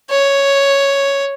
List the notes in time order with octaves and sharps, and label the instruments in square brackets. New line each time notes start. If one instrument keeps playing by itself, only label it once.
[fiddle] C#5